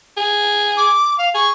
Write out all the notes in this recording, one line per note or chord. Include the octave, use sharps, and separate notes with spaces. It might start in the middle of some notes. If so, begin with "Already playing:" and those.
G#4
D6
F5
G#4 C#6